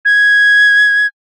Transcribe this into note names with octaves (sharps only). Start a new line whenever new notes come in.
G#6